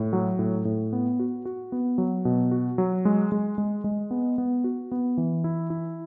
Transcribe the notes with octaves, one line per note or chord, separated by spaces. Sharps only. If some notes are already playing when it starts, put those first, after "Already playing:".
Already playing: A2
F#3
A2
A2
B3
F#4
F#4
B3
F#3
B2
F#4
F#3
G#3
G#3
G#3
G#3
B3
B3
F#4
B3
E3
E4
E4